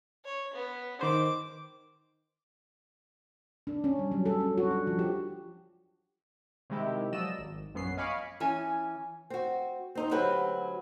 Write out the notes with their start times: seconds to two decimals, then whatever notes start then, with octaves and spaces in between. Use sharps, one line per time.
0.25 C#5
0.54 B3
1.01 D#3 C5 D6
3.67 D4
3.84 C#4
3.99 G3
4.11 F#3
4.26 A4
4.41 C#4
4.58 F#4
4.71 D4
4.87 F3
4.99 G4
6.70 C3 D#3 G#3 E4 G4
7.12 F3 F#3 D5 D#5 E6 E7
7.39 G#1
7.75 A#1 F#2 B3 C#4 C7
7.97 D#5 F5 G#5 B5 C#6 D6
8.40 E3 C#4 G#5
9.30 C4 F#4
9.95 C4 D#4 C5
10.11 D2 F#3 C4 G4 B4